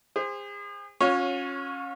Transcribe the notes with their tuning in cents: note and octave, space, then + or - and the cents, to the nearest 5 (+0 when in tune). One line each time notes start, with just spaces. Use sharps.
G#4 -40 C5 +0
C#4 -10 F4 +40 C#5 +0